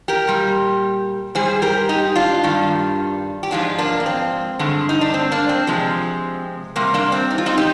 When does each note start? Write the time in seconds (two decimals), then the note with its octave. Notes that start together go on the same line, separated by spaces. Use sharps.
0.08 G4 A#4
0.27 A#2 G3
1.35 G#2 G3 G#4 C5
1.62 G4 A#4
1.89 D#4 G4
2.16 D4 F4
2.44 G2 D#3 G3
3.43 G4
3.51 G#2 F3 G#3 D4 F4
3.78 A#3 D4
4.00 A#3
4.06 C4
4.59 G2 D3 G#3
4.89 D#4
5.01 D4
5.14 C4
5.32 A#3 D4
5.49 C4
5.67 C3 F3 G#3
6.76 C3 G3 A#3
6.94 A#3 D4
7.12 C4
7.31 D#4
7.38 F4
7.46 C4 D#4
7.58 D#4 G4